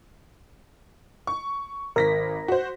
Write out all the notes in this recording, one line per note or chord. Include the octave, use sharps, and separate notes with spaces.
C#6
G#1 A#4 A#6 B6
F#4 C5